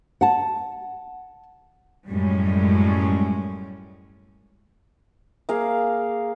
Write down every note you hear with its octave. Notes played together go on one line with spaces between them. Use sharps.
F#5 A5
F#2 A2 G3 G#3 C#4
A#3 G#4 F5